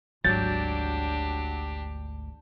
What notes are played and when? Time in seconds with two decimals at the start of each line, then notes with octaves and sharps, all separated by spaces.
0.24 G#1 D2 F#3 D4 G4 G6 A6